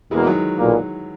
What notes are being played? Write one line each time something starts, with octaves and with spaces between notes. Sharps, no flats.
E2 B2 E3 G#3 A#3
D#3 F#3
B1 A#2 A#3